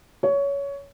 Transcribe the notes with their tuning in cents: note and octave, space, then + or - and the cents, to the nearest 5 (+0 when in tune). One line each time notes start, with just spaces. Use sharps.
C#5 +20